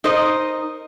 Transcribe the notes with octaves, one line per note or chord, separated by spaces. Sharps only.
D#4 A#4 C5 D#5